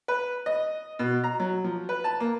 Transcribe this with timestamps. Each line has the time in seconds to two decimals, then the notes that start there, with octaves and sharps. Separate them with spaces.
0.08 B4
0.46 D#5
0.99 B2
1.24 A#5
1.40 F#3
1.64 F3
1.89 B4
2.04 A5
2.20 A#3